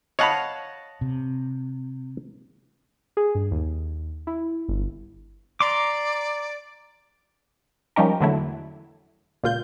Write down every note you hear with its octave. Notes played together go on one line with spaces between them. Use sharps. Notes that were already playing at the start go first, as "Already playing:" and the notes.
C#5 D#5 F5 F#5 A5 B5
C3
G#4
G2
D#2
E4
G1
D5 A#5 C6 D6
F3 G3 C#4 D#4 G4 A#4
E2 D3 F#3 A3 E4
C#2 A#2 F4 G6